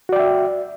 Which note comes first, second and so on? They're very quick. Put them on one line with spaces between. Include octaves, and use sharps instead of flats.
F#4 D5 G5 E5